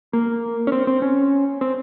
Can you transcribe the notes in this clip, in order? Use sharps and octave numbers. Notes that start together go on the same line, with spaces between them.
A#3
C#4
C4
C4
C#4
C4